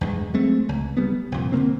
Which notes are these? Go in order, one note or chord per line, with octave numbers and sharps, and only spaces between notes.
E2 G2 G#3
F#3 G#3 A3 C4
C#2
G3 A3 B3
C2 F2 A#2
D3 F#3 A#3 C4